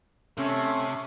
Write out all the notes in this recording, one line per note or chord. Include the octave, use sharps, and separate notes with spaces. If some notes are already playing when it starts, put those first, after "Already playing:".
C3 A3 C#4